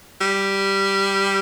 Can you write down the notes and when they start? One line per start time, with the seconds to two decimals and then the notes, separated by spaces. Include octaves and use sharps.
0.21 G3